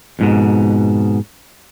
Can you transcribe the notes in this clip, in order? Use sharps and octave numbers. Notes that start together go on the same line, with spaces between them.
F2 G#2 B2